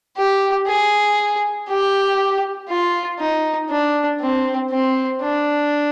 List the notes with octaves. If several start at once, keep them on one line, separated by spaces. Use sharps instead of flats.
G4
G#4
G4
F4
D#4
D4
C4
C4
D4